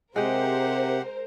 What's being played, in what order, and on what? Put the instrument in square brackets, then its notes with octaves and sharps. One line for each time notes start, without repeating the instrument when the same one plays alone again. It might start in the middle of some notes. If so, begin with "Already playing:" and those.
[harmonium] C3 [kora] G#3 G5 [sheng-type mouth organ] G4 F#5 [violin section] A#4 C5